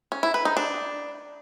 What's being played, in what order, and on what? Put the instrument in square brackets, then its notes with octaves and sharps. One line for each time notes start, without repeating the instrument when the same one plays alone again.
[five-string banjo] C#4
E4
B4
D#4
D4